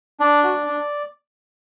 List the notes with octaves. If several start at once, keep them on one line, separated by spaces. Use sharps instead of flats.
D4 D5
F#4
D4